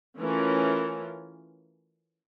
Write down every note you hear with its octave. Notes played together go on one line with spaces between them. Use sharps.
E3 A3 C#4 F4 A#4